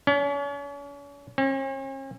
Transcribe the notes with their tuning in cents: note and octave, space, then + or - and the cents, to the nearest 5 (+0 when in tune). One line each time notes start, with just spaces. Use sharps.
C#4 +40
C#4 -45